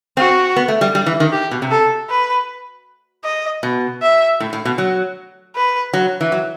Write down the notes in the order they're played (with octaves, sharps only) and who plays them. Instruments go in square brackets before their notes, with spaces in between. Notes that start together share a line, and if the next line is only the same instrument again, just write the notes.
[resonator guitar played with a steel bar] C4 [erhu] F#4
[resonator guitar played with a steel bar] B3
A3
G3
G3
E3
D#3
[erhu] G4
[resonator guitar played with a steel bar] B2
C3
[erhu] A4
B4
D#5
[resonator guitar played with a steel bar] B2
[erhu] E5
[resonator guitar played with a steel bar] A2
A2
B2
F#3
[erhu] B4
[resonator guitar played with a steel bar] F#3
E3
F#3